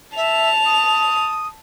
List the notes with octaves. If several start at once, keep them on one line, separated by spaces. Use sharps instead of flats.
E5 A5 F7
D#6